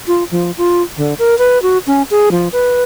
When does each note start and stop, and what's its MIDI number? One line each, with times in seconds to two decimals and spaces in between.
0.07 0.24 65
0.31 0.51 53
0.58 0.82 65
0.97 1.14 50
1.19 1.37 70
1.39 1.61 71
1.62 1.78 66
1.87 2.02 61
2.11 2.29 68
2.31 2.48 53
2.52 2.83 71